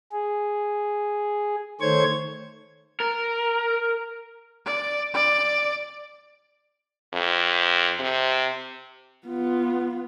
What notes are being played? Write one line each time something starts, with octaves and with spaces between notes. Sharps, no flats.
G#4
D#3 A3 C5 C#5 C#6 G#6
A#4
D5
D5
F2
C3
B3 F4